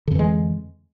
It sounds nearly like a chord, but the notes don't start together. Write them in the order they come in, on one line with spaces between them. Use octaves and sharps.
D3 F2 E3 G#3